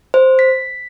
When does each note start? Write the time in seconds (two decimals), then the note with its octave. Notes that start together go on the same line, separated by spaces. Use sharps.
0.14 C5
0.39 B6